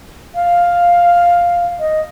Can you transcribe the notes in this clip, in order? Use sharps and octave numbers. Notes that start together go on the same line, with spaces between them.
F5
D#5